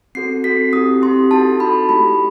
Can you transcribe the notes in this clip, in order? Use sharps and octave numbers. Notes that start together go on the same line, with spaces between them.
C4 F#4 A4 C7
C4 F#4 A4 B6
C4 E4 G4 D#6
C4 E4 G4 C6
D#4 F#4 A4 A5
D#4 F#4 A4 B5
A3 E4 G4 B5